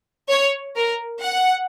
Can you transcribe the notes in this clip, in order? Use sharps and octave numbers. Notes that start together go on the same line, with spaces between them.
C#5
A#4
F#5